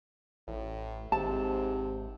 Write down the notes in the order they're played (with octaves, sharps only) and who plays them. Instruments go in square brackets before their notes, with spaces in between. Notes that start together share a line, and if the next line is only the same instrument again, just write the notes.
[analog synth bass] A1 [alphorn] A2
[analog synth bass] G#1 [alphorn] G#2 [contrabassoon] C3 [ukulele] A5